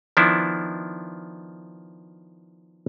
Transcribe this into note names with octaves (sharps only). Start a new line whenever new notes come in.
D#3 F3 B3 D4 E4